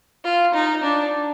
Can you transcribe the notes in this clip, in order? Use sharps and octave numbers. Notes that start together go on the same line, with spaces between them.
F4
D#4
D4